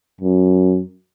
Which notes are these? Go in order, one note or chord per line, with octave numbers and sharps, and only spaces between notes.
F#2